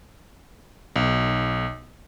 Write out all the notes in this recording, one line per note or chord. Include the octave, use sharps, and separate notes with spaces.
B1